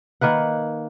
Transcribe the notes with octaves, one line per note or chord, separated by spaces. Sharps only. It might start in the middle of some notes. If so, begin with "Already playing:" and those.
D#3 A#3 B4 F#5